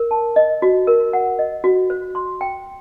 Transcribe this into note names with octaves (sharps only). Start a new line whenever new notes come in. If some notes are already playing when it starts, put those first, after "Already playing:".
Already playing: A#4
A5
D#5
F#4
A#4
F#5
D#5
F#4
C5
C6
G5